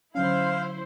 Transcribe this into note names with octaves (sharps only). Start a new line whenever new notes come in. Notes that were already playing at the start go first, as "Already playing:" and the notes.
D3 F#3 C#4 E4 C5 F5